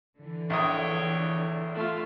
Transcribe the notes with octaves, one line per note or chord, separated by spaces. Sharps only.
D3 E3
A#1 E2 C#5 G5 D#6
A3 F4